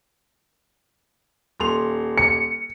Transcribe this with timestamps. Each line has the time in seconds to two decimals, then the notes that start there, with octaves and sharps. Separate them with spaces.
1.60 D#1 C6 F7
2.18 C#7